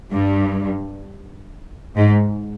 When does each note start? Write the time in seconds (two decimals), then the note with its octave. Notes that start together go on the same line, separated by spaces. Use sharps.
0.12 G2
1.96 G#2